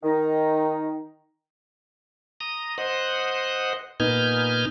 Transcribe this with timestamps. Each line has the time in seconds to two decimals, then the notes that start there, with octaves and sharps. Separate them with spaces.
0.03 D#3 D#4
2.41 A#5 D#6
2.78 C5 D#5 F#5
4.00 A#2 B3 D#4 G#5 F6 G6